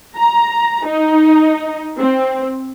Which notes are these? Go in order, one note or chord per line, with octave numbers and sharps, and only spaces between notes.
A#5
D#4
C4